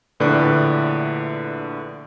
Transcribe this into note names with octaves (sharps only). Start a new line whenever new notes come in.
A#1 A2 D3 B4 D5 F#6